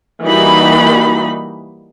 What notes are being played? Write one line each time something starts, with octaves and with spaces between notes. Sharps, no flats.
E3 G3 A#3 D#4 F#4 B5